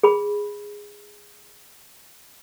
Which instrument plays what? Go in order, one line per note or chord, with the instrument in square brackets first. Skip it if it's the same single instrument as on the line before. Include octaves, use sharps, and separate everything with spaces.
[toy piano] G#4 B5